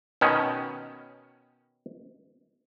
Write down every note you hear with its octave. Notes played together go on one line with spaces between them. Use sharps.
B2 D#3 C#4